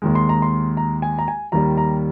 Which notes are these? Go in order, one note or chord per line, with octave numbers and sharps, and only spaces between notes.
D#2 D#3 G#3
C6
A#5
C6
A#5
G#5
A#5
G#5
D#2 D#3 G3 A#5
A#5